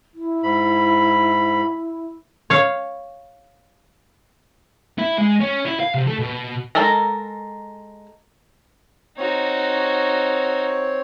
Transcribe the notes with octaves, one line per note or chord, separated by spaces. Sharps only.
E4
G#2 B5
C#5 F5
E4
G#3
C#4
E4
F5
C3
A3
B2
G#3 A4 A#4 A#5
C4 D#4 F#4 C#5